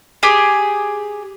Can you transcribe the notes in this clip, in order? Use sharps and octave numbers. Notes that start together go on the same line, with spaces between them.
G4 G#4